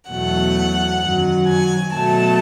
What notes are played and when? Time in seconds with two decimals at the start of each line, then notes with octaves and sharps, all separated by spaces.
0.11 E2 B2 F#3 A3 F#5
1.02 F#2 D#3 F#3
1.48 G#5
1.94 B2 F#3 A3 A5